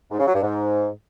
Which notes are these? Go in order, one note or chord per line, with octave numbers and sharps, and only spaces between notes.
G#2
C#3
F#3
G2
G#2